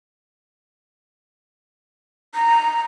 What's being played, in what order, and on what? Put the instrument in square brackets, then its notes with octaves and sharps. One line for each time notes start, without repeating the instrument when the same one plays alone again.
[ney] A#5